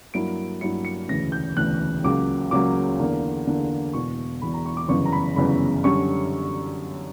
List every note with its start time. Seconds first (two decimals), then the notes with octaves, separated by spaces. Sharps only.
0.14 G2 F#3 A#3 E4 D7
0.61 G2 F#3 A#3 E4 C#7
0.85 C#7
1.08 E1 D2 C#3 E3 A#6
1.32 G6
1.56 E1 D2 C#3 E3 F#6
2.04 C#2 C#3 F#3 A#3 C#4 D6
2.51 C#2 C#3 F#3 A#3 C#4 D6
2.99 E2 D3 A#3
3.47 E2 D3 A#3
3.93 E1 E2 B2 C#6
4.42 E1 E2 B2 B5
4.54 A#5
4.65 C#6
4.77 D6
4.88 G1 F#2 C#3 E3 B3 C#6
5.06 A#5
5.12 B5
5.36 G1 F#2 C#3 E3 B3 B5
5.84 F#2 D3 G3 C#4 C#6